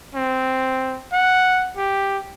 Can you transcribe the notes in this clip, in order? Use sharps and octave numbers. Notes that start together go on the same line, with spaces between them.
C4
F#5
G4